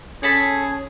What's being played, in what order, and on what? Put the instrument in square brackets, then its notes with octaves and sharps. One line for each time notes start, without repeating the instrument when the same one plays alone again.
[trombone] C#4 [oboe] G#4 [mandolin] A4 A5 B5